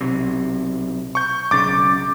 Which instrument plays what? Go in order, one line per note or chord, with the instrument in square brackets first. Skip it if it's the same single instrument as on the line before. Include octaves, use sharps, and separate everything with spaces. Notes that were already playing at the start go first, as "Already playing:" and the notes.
[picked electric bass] B1 C3
[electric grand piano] C#6 G6
[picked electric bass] B1 C#3 [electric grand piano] D6 A6